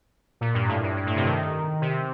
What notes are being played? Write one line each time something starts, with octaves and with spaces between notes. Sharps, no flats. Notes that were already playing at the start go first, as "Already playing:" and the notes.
A#2
G2
A2
G2
G2
A2
C3
D#3
C3